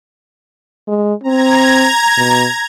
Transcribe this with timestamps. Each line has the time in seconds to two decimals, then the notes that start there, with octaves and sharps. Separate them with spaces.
0.88 G#3
1.24 C4 A#5 G#6
2.17 B2